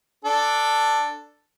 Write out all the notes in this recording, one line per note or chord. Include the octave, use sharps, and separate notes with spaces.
D4 A4